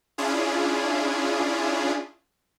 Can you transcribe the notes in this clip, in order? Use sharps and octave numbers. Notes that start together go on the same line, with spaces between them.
C#4 D4 E4 F4 G#4